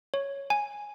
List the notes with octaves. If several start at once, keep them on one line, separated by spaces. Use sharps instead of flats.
C#5
G#5